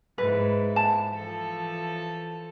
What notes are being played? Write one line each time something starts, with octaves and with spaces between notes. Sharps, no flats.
G#2 E4 B4
A5
E3 F3 A4